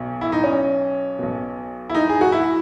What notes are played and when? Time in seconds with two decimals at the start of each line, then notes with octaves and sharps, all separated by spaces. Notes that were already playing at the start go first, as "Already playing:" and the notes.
Already playing: B1 B2
0.21 E4
0.32 D#4
0.44 C#4
1.19 B1 B2
1.89 E4
1.95 D#4
2.09 G#4
2.21 F#4
2.32 E4